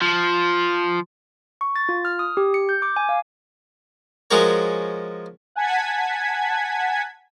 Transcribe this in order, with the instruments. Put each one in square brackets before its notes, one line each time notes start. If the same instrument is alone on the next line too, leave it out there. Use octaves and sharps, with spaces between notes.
[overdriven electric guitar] F3
[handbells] C#6
A6
F4
F6
D#6
G4
C#7
G6
D6
G#5
F5
[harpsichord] F3 G#3 C#4 F#4 A#4 C#5
[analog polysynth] F#5 G#5 A5 G#6 B6